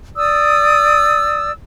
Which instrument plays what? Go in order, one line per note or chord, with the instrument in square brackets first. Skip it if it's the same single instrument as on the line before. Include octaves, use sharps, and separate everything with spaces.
[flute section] D5 D#6 E6